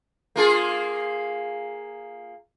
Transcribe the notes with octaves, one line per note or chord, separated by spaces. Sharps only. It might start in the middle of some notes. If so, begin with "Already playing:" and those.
A#3 F4 G#4